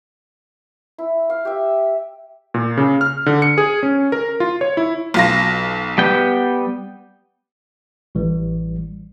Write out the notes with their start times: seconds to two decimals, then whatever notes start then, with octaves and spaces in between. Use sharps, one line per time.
0.98 E4
1.30 F5
1.45 G4 E5
2.54 A#2
2.77 C#3
3.01 F6
3.26 D3
3.42 C#7
3.58 G#4
3.83 C#4
4.12 A#4
4.40 F4
4.61 C#5
4.77 E4
5.14 B1 F4 A#6
5.98 G3 B3 G5
8.15 A1 E3 G3